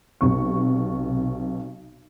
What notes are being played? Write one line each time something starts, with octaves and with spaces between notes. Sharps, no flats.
B1 C3 C#6